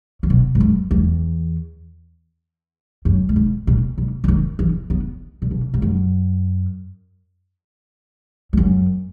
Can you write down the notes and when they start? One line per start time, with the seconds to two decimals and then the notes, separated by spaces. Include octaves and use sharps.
0.23 C#3
0.30 B2
0.55 G#2
0.60 F#2
0.91 E2
3.05 F#2
3.29 A#2
3.36 G#2
3.67 A#2
3.98 B2
4.24 C#3
4.28 D#3
4.59 E3
4.90 B3
5.42 A#2
5.51 B2
5.74 G#2
5.82 F#2
8.53 E2
8.57 F#2